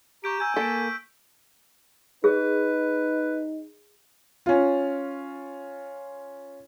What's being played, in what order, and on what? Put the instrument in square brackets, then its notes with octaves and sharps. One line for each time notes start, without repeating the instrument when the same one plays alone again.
[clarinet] G4 [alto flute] A#5 [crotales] C#6 G6 D7
[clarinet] G#5 [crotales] E6 G6
[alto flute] A#3 [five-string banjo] A4 [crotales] B6 D7
[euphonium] D#4 [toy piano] G#4 [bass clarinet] B4
[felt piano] C#4 F4